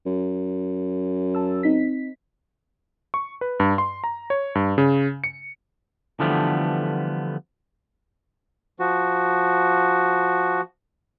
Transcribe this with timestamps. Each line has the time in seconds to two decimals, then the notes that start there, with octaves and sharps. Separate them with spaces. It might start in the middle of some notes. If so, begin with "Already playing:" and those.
0.06 F#2
1.35 A5 E6
1.63 C4 D#4 B6
3.14 C#6
3.41 B4
3.60 G2
3.78 C6
4.04 A#5
4.30 C#5
4.55 G2
4.78 C#3
5.24 C#7
6.20 D3 E3 F3 G3 A3 B3
8.79 F3 F#4